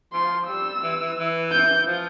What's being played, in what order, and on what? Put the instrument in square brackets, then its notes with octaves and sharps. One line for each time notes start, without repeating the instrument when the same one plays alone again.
[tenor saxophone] F3 [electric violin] C6
[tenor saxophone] G3 [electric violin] E6
[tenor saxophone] E3
E3
E3
[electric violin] G6
[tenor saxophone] F3